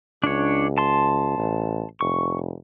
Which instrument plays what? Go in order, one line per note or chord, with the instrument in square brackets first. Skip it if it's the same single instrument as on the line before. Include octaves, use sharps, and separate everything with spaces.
[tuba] C#2 [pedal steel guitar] D4 C#5
[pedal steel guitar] A5 C6
[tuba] A1
[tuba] F1 [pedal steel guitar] C#6